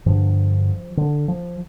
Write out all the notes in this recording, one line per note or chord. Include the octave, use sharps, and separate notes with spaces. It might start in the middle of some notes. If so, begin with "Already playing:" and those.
G2 D3 F3
D3
F3